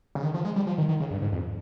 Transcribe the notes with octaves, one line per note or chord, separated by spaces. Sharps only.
C#3
D#3
F3
G#3
G3
F3
D#3
D#3
C#3
G2
G#2
F2